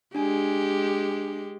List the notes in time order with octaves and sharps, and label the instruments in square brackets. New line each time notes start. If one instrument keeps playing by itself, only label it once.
[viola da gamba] G#3 G4 [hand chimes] D4 G#5